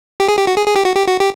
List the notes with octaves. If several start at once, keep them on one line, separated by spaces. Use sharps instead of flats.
G4
G#4
G4
F#4
G#4
G#4
G4
F#4
G4
F#4
G4